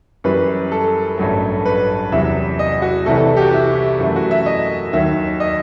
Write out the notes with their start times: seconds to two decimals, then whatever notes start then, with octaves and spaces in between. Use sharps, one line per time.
0.24 F#2 E3 G3 B4
0.72 A4
1.18 A1 G2 F#3 A3
1.66 B4
2.12 E2 C3 F#3 E5
2.59 D#5
2.82 F#4
3.06 C2 C3 E3 A4
3.17 A4
3.37 G4
3.41 F#4
3.53 E4
3.99 F#2 E3 A3 E4
4.16 F#4
4.31 E5
4.46 D#5
4.93 D#2 D#3 F#3 E5
5.40 D#5